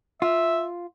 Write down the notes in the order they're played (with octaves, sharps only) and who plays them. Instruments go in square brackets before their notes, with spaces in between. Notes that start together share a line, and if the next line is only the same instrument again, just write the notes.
[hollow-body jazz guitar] F4 [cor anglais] E5